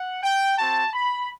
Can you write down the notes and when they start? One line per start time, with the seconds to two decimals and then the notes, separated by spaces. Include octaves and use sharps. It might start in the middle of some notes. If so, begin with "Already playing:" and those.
Already playing: F#5
0.23 G5
0.58 C4 F#4 A5
0.94 B5